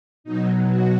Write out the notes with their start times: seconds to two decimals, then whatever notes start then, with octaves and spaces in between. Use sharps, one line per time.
0.24 B2 F#3 D#4
0.67 F#4